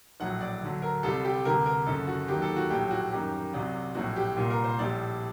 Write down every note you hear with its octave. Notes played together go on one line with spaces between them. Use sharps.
A#1 A2 F#3 F#5
D5
D2 D3 F#3
A#4
C2 C3 G3 A4
G4
D2 C3 G3 A#4
A#4
F#1 F#2 D3 A4
F#4
D#2 D#3 F#3 G4
A4
F#4
A#1 A2 F#3 G4
F#4
F#2 D#3 G3 G4
C2 C3 F#3
A#1 A2 F#3 F#4
G4
C2 A#2 G3
A#4
C5
A#1 A2 G3 D5